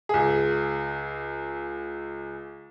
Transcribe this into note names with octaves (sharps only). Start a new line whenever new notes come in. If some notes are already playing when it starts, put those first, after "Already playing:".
C#2 G#4